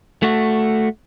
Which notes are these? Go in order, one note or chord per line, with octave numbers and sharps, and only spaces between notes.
A3 F#4